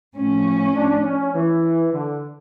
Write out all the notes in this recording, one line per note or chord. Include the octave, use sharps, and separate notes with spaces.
A2 F3 C#4
D4
C#4
E3
D3